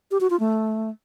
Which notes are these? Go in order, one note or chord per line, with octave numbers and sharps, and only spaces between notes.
G4
F#4
F4
A3